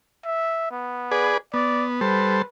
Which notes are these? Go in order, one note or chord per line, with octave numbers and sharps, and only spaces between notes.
E5
B3
G#4 B4 D5
B3 D5
G3 A4 B4 C5